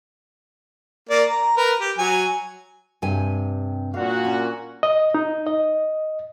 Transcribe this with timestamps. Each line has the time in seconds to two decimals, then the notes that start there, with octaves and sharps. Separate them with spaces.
1.10 A#3 D5
1.30 A#5
1.57 A#4 B4
1.81 G4
1.98 F#3 G#5
3.02 G2 C3 G#5
3.94 A#2 F#4 F5
4.25 C#4
4.83 D#5
5.15 D#4
5.46 D#5